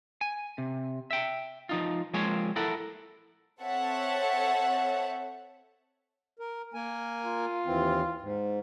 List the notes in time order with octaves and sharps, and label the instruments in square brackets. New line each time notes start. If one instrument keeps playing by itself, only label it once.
[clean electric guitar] G#5
C3
E5 G5
F3 D#4 F4
F3 G#3 A#3 C4 G#4 C#5
E4 A4 A#4 F#5
[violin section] C4 A4 C#5 E5 F#5 A5
[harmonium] A#4
A#3 A#4 G#5
[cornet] F4
[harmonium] D#2 E3 C4
G#2